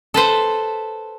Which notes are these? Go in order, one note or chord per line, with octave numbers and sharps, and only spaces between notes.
A4 B4 C5